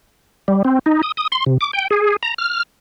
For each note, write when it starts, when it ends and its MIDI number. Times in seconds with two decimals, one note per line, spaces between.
0.48 0.62 55
0.65 0.79 60
0.86 1.01 63
1.03 1.12 87
1.17 1.27 87
1.32 1.44 84
1.46 1.58 48
1.61 1.71 86
1.73 1.88 79
1.91 2.16 68
2.23 2.34 82
2.38 2.63 89